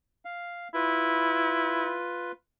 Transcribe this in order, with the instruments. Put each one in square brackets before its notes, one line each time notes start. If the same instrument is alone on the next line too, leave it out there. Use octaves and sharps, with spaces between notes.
[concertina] F5
[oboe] E4 [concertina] F4 B4